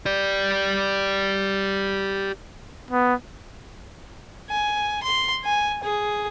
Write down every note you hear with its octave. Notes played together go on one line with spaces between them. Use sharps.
G4 D5
B3
G#5
C6
G#5
G#4